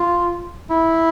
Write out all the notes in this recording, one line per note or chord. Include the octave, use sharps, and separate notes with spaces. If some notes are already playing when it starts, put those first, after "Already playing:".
Already playing: F4
E4